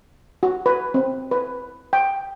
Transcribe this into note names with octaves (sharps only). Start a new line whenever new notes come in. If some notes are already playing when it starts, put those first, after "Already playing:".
F#4
B4
C4
B4
G5